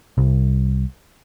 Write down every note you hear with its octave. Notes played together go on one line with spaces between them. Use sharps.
C2